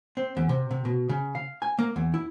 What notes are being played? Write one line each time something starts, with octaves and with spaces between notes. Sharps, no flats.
C4
E2
C3
C3
B2
C#3
F5
G#5
A#3
E2
E4